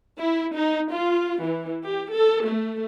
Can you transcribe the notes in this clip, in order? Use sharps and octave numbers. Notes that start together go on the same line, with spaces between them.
E4
D#4
F4
E3
G4
A4
A3